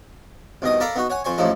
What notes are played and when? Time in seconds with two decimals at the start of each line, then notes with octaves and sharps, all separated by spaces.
0.62 C2 B2 D#3 D#5 D#6
0.80 A4 A#4 D5 F5 A#5 B5
0.95 B3 D#4 F#4
1.10 C#5 F#5 G#5
1.25 F2 C5 G#5 C#6
1.38 A1 D#2 A2 F3 D#4 A4